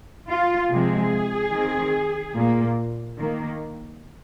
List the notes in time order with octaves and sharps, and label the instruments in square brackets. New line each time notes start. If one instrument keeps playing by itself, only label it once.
[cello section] F4
C3 F3 G#3 C4 G#4
D#3 C4
A#2 A#3
D#3 A#3